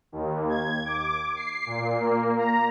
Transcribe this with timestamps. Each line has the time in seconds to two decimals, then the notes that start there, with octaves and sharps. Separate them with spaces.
0.12 D#2
0.49 G#6
0.85 D6
1.36 C7
1.66 A#2
2.00 A#3
2.38 A#5